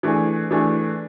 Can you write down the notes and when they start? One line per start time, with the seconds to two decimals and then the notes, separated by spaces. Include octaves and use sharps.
0.03 E3 A3 D4 G#4
0.51 E3 A3 D4 G#4